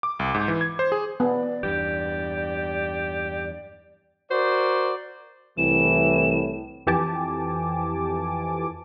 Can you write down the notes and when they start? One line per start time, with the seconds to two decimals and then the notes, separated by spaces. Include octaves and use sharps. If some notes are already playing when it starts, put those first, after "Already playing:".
0.03 D6
0.19 C2
0.34 G#2
0.48 E3
0.61 G#6
0.79 C5
0.92 G#4
1.20 B3 D5
1.63 E2 G2 G4
4.31 F#4 A#4 C5 D5
5.58 C2 A2 E3 E7
6.87 F2 E3 G4 G#5 A5 D6